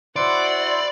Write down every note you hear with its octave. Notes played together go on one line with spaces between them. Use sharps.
E4 F#4 C5 D5 F#5 C6